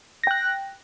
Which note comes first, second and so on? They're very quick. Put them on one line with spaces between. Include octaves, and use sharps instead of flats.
A#6 G5 F#6